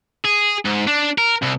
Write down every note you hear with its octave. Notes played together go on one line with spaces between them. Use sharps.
G#4
G#2
D4
A#4
C2